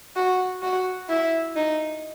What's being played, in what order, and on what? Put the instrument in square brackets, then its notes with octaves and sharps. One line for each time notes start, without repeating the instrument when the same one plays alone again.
[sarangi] F#4
F#4
E4
D#4